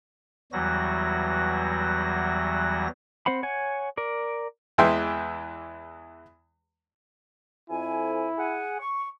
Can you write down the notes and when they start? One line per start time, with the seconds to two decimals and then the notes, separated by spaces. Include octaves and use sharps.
0.52 E2 E3 F#3 G3 F#4 A#6
3.26 C4 C5 F#5 B5
3.43 C#5 F#5 G#5
3.97 A#4 D5
4.78 E2 E3 G#3 E5 G5 C6
7.70 F2 E4 G#5
8.38 G#4 F#5 G#5
8.79 C#6